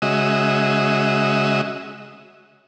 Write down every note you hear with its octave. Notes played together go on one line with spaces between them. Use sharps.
C#3 G#3 F#4 D#5 E5